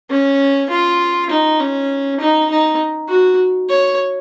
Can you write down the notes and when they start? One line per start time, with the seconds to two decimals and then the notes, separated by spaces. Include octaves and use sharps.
0.10 C#4
0.70 F4
1.30 D#4
1.60 C#4
2.21 D#4
2.50 D#4
3.09 F#4
3.70 C#5